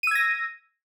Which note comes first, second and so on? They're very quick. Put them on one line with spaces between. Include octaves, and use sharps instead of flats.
D#7 E6 G#6 A#6